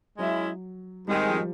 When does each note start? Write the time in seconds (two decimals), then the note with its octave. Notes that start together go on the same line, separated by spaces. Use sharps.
0.18 F#3 G#3 C#4 E4
1.07 G#2 D#3 G3 G#3 C4
1.30 F3